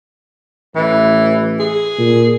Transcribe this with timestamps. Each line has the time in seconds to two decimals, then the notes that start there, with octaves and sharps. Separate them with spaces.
0.76 A1 E3
1.60 G#4
1.99 A#2